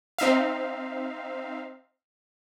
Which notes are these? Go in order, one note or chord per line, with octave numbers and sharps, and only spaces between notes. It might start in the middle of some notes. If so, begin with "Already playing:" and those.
C4 D#4 E5 F5